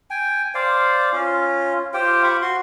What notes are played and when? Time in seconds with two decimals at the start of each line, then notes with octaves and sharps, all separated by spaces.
0.10 G5 G#5
0.55 C5 D5 F5
1.13 C#4 F4
1.94 F4 G4 C5 G5
2.24 F4 C5 B5 C#6
2.42 F#4 C6